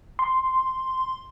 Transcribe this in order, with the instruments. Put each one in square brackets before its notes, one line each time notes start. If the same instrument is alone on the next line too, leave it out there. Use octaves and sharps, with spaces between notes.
[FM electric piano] C6